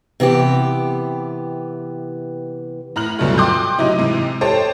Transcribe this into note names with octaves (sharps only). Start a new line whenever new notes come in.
C3 E3 B3 G4
A2 A#5 F6 F#6 F#7
D2 G2 B2 F3 F#3 A3
G5 C6 D6 D#6 F#6 G6
A2 C3 F#3 D#4 E4 D#5
G#2 C3 E3
G4 A4 C5 C#5 G5 A5